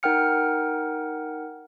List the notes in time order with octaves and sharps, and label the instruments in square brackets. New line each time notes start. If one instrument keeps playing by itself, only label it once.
[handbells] D#4 A#4 F#5 G5 F6 C#7